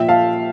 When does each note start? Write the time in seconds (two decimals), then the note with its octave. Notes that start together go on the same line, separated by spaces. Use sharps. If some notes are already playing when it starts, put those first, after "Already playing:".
Already playing: A#2 F3 E5 G5
0.09 F5 A5